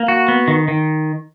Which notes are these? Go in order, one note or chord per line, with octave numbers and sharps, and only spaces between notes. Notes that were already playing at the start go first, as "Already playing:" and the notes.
Already playing: A#3
F#4
B3
D#3
D#3